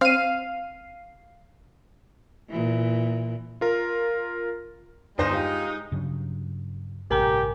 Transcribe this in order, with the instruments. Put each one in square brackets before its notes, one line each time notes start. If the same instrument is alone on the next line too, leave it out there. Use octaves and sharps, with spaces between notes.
[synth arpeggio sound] C4 D#7 [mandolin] F5
[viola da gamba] A#2 E3
[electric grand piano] F4 A#4
[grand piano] G1 C5 A#6 [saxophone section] G#3 D#4
[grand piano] F4 G4
[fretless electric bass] G2 C#3 F#3
[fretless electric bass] A1 G2 C3 [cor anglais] G4 [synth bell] A#4 G#5 A#5